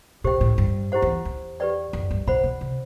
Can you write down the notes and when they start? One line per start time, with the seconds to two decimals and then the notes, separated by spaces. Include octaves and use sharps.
0.24 B2 G4 C5 G5
0.41 A2
0.58 G2
0.92 E4 G4 C5 F#5
1.02 E2
1.25 E2
1.60 G4 B4 D5 G5
1.93 F#2
2.11 G2
2.27 B2 C5 F#5 B5
2.44 B2
2.61 C3